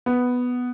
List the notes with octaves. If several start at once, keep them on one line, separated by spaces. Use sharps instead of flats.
B3